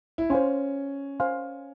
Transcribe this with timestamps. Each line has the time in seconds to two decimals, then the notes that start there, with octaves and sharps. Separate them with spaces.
0.18 E4
0.30 C#4 C5 F5 G#5 C6
1.20 C5 F5 G#5 C6